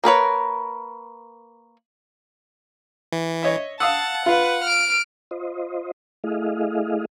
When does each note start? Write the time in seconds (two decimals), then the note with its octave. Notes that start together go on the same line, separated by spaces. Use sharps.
0.04 A#3 A#4 B4 C#5
3.12 E3
3.43 C#5 D#5 E5
3.80 F5 F#5 A5 D#6 E6
4.26 F4 B4 F5
4.64 F6 D7
5.31 F4 C5 D#5
6.24 A3 E4 G#4 D#5 F5